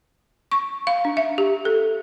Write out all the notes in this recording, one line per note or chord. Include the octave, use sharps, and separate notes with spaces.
C#6
F5
D4
E5
G4
A4